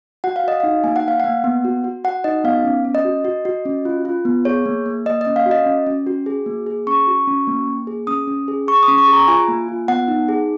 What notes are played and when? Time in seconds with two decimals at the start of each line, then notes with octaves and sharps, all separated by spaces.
0.24 F#4 F#5
0.36 F5
0.44 F#4 D#5
0.60 D#4 F5
0.84 A#3 G#5
0.96 F#5
1.04 A#3 F5
1.20 A#3 F#5
1.44 B3
1.64 F#4
1.84 F#4
2.04 F#4 F#5
2.24 D#4 D#5
2.44 B3 F5
2.65 C#4
2.85 C#4
2.95 D#5
3.05 F#4
3.25 F#4
3.45 F#4
3.65 C#4
3.85 F4
4.05 F4
4.25 B3
4.45 G#4 C#5
4.66 A#3
4.86 A#3
5.06 A#3 D#5
5.21 D#5
5.26 C#4
5.36 F5
5.46 F#4
5.51 D#5
5.66 C#4
5.87 C#4
6.07 F#4
6.26 G#4
6.46 A#3
6.67 G#4
6.87 C#4 C#6
7.07 F#4
7.27 C#4
7.47 A#3
7.67 A#3
7.87 G#4
8.07 C#4 D#6
8.28 C#4
8.48 G#4
8.68 G#4 C#6
8.83 D#6
8.88 C#4
8.98 C#6
9.08 G#4
9.13 A#5
9.28 F4 G#5
9.48 A#3
9.68 F4
9.88 B3 F#5
10.08 D#4
10.28 G#4